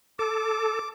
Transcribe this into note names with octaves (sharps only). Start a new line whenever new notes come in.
A4 D6